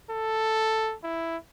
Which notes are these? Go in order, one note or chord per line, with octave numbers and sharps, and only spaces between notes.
A4
E4